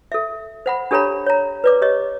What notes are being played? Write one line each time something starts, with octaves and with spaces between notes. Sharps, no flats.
A4 E5
C5 F#5 B5
D4 G4 A4 C#5 A#5 B5
C#5 A#5
B4 D5 D6
G4 C#5 D#5